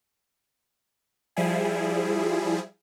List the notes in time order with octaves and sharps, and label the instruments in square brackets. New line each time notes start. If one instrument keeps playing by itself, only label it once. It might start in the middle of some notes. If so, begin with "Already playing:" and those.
[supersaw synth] F3 G3 E4 G#4